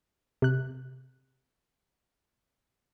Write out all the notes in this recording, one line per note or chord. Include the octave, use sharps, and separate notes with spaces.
C3 F#6